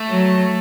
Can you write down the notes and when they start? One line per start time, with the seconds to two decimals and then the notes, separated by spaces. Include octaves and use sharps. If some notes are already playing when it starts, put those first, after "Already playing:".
Already playing: A3
0.09 F#3